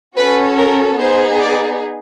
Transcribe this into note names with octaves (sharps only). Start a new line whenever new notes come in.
C#4 F#4 A4 B4
A#4
B3 D#4 G#4 C5
D5